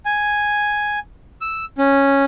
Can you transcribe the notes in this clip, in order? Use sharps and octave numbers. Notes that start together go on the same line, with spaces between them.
G#5
E6
C#4